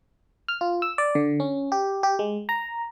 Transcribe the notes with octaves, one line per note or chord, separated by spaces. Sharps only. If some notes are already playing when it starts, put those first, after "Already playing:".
F6
F4
E6
D5
D3
C#4
G4
G4
G#3
A#5